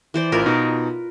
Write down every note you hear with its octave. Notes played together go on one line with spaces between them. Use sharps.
E3 C5 D5
A1 F4 A#4 B4
B2 D#4